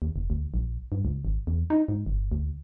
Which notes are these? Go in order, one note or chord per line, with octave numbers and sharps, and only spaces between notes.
D#2
F1
D2
A#1
G2
C#2
G#1
E2
D#4
G#2
G1
D2